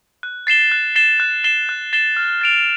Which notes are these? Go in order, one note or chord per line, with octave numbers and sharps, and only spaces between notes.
F#6
A6 C7 E7 G7
F#6
A6 C7 E7 G7
F#6
A6 C7 E7 G7
F#6
A6 C7 E7 G7
F6
A6 D7 F7